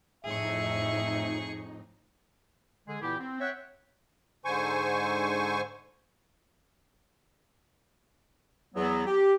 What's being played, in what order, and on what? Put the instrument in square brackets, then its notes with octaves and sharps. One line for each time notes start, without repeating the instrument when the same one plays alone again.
[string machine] F2 D#4 [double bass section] A2 [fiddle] G#4 C#6 [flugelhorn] E5
[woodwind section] D3 G#3 G#4
A#2 E3 B3 E4 G4
C4
C#5 E5 F#5 G5
[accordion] G#2 D3 C5 G#5 C#6
[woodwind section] E2 F#3 B3
G4